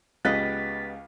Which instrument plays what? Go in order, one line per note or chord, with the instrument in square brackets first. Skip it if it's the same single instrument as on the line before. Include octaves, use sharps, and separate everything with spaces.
[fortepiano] C#2 C#3 F#6 [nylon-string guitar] B3 G4 D#5 [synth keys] A6 B6